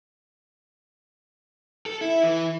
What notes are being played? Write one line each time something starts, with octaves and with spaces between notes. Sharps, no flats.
A4
E4
E3